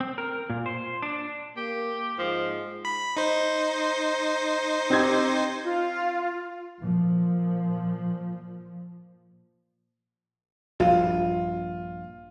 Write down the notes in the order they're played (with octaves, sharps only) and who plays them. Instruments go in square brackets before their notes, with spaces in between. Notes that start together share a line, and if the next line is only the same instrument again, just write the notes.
[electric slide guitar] C4
A#4
A#2
C5
D4
[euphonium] A#3 [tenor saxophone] G4
[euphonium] G#2 [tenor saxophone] F3
[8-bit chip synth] B5
D#4 C5
[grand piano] C4 G4 G#6
[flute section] F4
[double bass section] A#2 F3
[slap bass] A#1 G2 [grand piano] F4